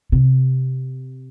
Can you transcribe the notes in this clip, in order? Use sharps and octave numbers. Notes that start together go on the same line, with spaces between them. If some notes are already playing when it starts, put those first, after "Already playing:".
C3